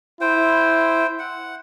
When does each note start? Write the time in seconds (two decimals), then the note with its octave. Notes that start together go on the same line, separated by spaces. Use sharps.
0.21 E4 C5 G5
1.19 F#5